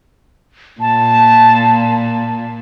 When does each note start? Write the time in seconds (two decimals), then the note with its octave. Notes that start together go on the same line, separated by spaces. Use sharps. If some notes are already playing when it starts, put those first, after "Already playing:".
0.81 A#2 A5